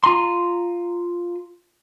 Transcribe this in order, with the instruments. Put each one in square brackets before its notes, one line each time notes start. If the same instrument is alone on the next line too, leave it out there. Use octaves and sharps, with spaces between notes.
[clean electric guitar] F4 A#5 C6